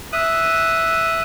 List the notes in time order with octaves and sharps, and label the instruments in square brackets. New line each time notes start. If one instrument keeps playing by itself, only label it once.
[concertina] E5 D#6 F#6